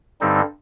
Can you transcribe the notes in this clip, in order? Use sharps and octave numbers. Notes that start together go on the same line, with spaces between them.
G2 D3 G3 C4 D#4